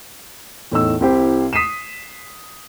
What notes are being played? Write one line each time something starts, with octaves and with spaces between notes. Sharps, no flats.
E2 A2 D#4 E6
C2 C3 E4 G4 C5
D#6 B6 C7 D#7 E7